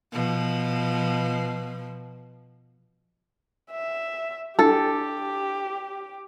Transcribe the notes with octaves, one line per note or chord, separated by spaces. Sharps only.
B2 F3
E5
D4 E4 G4 A4 A6